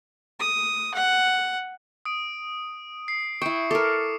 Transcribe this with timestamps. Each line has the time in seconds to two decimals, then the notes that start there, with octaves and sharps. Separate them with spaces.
0.40 D#6
0.95 F#5
2.05 D#6 D7
3.08 C7
3.42 E4 G5 C#6 C#7
3.71 A4 A#4 D6